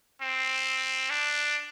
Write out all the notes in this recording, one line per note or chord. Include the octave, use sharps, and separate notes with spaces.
C4
D4